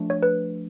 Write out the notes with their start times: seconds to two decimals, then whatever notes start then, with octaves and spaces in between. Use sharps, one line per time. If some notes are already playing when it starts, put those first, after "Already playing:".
Already playing: F3 A3 D4
0.10 C#5
0.23 B4